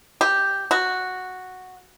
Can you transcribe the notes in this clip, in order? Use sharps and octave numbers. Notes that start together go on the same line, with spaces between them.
G4
F#4